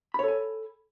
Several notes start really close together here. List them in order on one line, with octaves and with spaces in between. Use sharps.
B5 C#5 A4 G#5